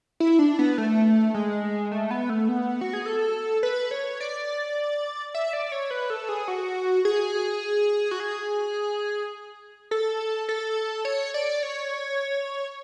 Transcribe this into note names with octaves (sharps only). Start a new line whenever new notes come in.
E4
D4
B3
A3
G#3
A3
B3
A3
B3
F#4
G#4
A4
B4
C#5
D5
E5
D5
C#5
B4
A4
G#4
F#4
G#4
F#4
G#4
A4
A4
C#5
D5
C#5